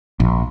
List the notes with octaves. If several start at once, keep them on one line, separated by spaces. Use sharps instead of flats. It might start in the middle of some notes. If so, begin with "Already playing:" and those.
A#1